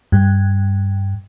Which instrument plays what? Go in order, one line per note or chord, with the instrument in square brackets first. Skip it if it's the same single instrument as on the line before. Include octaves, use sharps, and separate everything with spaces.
[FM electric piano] G2